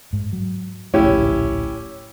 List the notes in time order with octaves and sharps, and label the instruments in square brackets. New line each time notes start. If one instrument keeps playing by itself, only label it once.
[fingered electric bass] G#2
F#3
[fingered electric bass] D1 A#1 A3 [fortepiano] C#4 E4 G4